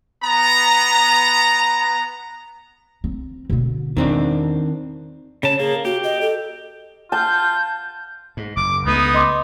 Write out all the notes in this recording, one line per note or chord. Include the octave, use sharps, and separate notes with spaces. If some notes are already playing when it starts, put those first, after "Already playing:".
B3 A#5
C4
B2 D3
E2 D#3 C4 D4
C#3 C#5 A5
A#3 G#4
F#4 G4
D#5
A4
F4 A5 G6
G#2
F#1 D6
C#2 A3 B3 D#4
D#5 C6 D6